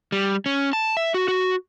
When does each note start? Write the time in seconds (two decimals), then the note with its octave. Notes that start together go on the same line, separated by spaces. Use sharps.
0.12 G3
0.46 C#4
0.73 A5
0.97 E5
1.14 F#4
1.28 F#4